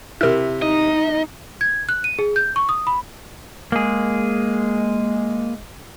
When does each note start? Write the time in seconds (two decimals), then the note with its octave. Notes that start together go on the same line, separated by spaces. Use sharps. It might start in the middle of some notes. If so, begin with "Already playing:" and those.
0.21 C3 E4 A#4 F6
0.62 D#4 D#5
1.61 G#6
1.89 F#6
2.04 D#7
2.19 G#4
2.36 G6
2.56 C#6
2.69 D#6
2.87 B5
3.72 G#3 A#3 G#4